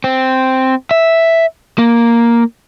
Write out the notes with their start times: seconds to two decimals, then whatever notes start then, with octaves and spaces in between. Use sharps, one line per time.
0.04 C4
0.91 E5
1.78 A#3